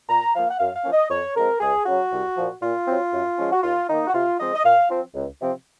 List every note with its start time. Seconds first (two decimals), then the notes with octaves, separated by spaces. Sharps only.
0.08 A#2 A#5
0.33 F3 A#3 F5
0.49 F#5
0.58 F#2 F5
0.75 F5
0.84 F3 A#3 C#4
0.92 D#5
1.09 F2 C#5
1.34 C#3 F3 G#3 C4 A#4
1.60 C#2 G#4
1.85 C#3 F#3 F#4
2.11 C2
2.36 A#2 F3
2.61 A#2 F4
2.86 F#3 C4
3.12 F#2
3.37 F3 G#3 C#4
3.51 F#4
3.62 D#2 F4
3.88 D#3 A#3 D#4
4.06 F#4
4.13 C3 F4
4.38 F3 G#3 C4 D#5
4.54 D#5
4.64 A#2 F5
4.89 F3 C4
5.14 C#2
5.39 C3 F3 C4